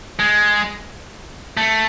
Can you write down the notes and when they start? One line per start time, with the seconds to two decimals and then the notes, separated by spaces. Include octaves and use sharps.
0.19 G#3
1.57 A3